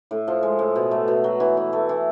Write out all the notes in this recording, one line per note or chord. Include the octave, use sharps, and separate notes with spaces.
A2
F3
G#3
A2
B2
A3
B2
F#3
E3
E3
A3
E3